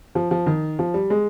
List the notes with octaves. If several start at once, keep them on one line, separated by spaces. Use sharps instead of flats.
F3
F3
D#3
F3
G3
G#3